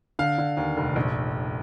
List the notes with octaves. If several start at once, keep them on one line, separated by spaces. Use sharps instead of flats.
D3 F5
D3
D#2
F1
A#1